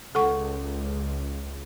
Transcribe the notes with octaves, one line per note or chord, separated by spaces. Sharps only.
C#2 A4 F#5 C#6